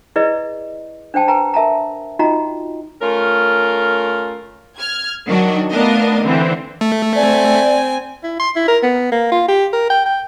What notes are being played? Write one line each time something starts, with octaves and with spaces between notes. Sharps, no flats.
E4 G#4 B4 D5 D#5
D4 C5 G5 A5
B4 G5 G#5 A#5
A#4 E5 A5 A#5
D#4 F4 F#4 D#5 G5 A#5
A3 C#4 F4 A#4
F6 G#6
D#3 F#3 D4 F#4
A3 B3 D4 A#4 D#5 F5
D3 E3 C4
A3
C4 D5 G#5
E4
C6
E4
A#4
B3
A#3
F4
G4
A#4
G5
G5